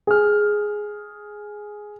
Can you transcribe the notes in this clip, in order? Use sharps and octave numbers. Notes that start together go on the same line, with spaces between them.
G#4 F6